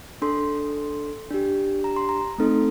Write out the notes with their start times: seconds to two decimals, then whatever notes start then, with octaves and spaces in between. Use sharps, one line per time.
0.22 D4 A4 C6
1.31 D4 G4
1.84 A#5
1.96 C6
2.09 A#5
2.38 A3 C4 D#4 A4